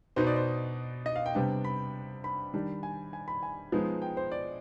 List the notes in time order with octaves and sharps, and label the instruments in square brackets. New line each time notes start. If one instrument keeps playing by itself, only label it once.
[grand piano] B2 B3 D#4 C5
D5
C5
D#5
F5
G5
C3 G3 B3 D4
B5
B5
D#3 G3 D4
G#5
G#5
B5
G#5
F3 G#3 B3 D#4
G5
C5
D5